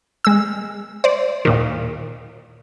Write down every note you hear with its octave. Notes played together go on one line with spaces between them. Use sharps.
G#3 E6
C5 D5
D#2 A#2 D#3